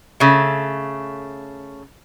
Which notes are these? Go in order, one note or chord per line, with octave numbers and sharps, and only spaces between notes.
C#3 A3